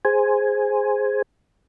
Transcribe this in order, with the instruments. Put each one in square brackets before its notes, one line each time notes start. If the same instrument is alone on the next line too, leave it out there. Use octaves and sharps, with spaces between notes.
[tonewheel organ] G#4 C5 G#5